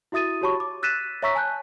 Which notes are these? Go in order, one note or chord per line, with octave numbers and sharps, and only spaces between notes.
E4 F#4 E5 D#6 A6 D#7
F#4 G4 C#5 A5 B5 C#6
D6
E6 F#6 A6 B6 D#7 E7
C#5 E5 A#5 C#6 E6 B6
G#5 A5 F#6 G6